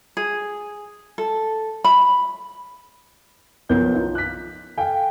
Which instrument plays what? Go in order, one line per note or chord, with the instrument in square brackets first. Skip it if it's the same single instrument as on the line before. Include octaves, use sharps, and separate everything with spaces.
[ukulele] G#4
A4
B5
[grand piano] B1 B2 F3 A#4 G6
D#4 F4
F#6 B6
A4 F5 G5 G#5